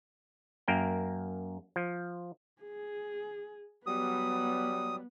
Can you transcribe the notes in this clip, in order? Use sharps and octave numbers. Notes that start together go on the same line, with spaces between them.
F#2 A#3 A#4 G5
F3
G#4
F#3 G3 B3 D#6